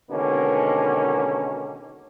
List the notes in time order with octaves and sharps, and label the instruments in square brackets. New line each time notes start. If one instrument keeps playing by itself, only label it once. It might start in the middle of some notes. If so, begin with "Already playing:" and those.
[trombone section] B2 D3 D#3 G#3 A#3 C#4